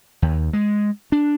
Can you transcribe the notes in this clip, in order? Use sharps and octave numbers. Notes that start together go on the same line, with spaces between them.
D#2
G#3
D4